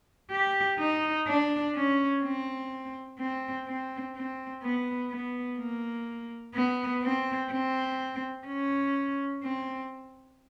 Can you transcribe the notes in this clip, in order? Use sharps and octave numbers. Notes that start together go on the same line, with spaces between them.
G4
D#4
D4
C#4
C4
C4
C4
C4
B3
B3
A#3
B3
C4
C4
C#4
C4